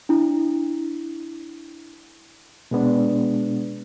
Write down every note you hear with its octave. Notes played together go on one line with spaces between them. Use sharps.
D4 E4
B2 G#3 B3 D4